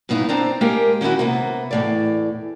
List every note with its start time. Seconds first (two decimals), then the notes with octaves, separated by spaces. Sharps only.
0.09 G2 C#3 B3 D#4 E4
0.29 C4 D4 C5 A#5
0.61 G#3 A#3 G4 G#4 A#4 G5
1.01 D#3 C#4 D#4 E4 F#4
1.19 C3 A#3 B3
1.71 E2 A2 D5